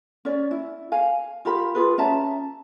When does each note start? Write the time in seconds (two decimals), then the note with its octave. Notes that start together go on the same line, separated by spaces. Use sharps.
0.25 C#4 D5
0.51 E4
0.92 F5 G#5
1.45 F4 G4 A#4 B5
1.75 F4 G#4 B4
1.98 C#4 E5 A5 A#5